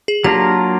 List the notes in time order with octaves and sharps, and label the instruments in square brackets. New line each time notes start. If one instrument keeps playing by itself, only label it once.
[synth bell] G#4
[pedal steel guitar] F#3 A#3 D4 F4 A#4 [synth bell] G4